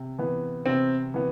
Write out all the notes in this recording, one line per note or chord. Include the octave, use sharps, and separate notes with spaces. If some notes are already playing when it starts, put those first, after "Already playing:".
Already playing: C3
E3 B3
C3 C4
E3 B3